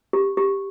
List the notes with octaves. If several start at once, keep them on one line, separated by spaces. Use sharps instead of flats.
G4
G4